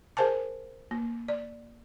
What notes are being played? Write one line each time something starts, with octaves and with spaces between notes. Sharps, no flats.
G#4 A#4 C5 G#5 A5
A#3
D5